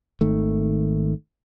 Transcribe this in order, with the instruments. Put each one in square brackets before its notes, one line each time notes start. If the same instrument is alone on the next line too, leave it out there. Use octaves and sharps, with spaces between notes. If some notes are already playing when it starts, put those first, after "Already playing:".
[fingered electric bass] G#1 D#3 A3